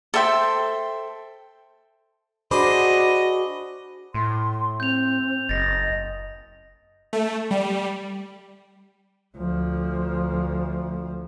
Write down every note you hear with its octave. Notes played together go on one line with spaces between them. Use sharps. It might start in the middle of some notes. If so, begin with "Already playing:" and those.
A4 C5 E5 G5
D4 F#4 G#4 C5 D#5 B5 D6
A2 C6
C4 G6 F7
F#1 D#5 A6 A#6
A3
G3
D2 F3